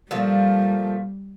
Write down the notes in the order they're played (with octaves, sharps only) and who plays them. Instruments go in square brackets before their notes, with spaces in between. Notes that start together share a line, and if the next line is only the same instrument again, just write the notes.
[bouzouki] A#2 F3 A3 [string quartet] G3